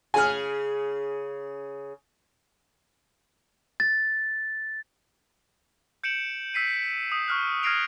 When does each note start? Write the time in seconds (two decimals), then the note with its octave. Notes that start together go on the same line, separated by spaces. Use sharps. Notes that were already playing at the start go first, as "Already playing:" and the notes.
0.14 C#3 G#4 G#5 F6
3.80 A6
6.04 G6 C#7 D7 E7 F#7
6.54 E6 B6 C7 D#7
7.10 D#6 B6
7.28 C#6 F6 F#6
7.63 F6 G#6 A#6 C7 D7 F7